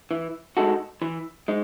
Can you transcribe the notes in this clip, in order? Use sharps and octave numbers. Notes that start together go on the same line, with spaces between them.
E3
G#3 D#4 F#4 A4
E3
G#3 D#4